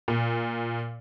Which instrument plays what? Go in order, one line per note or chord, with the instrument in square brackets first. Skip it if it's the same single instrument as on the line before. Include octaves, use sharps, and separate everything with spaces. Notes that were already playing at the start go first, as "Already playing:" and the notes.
[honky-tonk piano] A#2